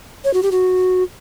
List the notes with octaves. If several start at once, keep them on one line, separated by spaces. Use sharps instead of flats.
C#5
F#4
G4
F#4